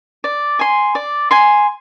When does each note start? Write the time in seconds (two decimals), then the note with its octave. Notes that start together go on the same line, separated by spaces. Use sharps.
0.24 D5
0.59 G#5 C6
0.95 D5
1.31 G#5 C6